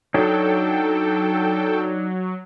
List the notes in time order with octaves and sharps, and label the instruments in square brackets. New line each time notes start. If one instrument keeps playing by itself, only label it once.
[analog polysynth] F#3 [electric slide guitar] D4 D#4 C#5 [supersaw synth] A4 G5